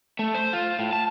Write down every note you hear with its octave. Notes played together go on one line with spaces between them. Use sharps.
A3
C5
F4
A2
A5